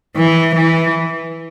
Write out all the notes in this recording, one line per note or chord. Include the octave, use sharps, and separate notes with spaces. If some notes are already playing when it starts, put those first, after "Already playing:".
E3
E3